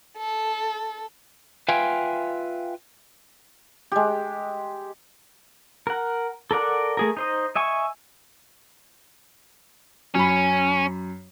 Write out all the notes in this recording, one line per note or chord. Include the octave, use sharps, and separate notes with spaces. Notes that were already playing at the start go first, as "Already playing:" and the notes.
A4
F4 B4 E5 F5 G5 G#5
G#3 G4
A#4 F#5
A4 A#4 D5 F#5
A3 G#4 A#4
D#4 C5 D#5
D#5 E5 G#5 C#6
F#2 C#4 B5